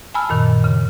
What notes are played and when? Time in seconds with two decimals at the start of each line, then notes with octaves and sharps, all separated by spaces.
0.14 G#5 A5 B5 E6 F6
0.29 F#2 A#2 D#3
0.64 C#3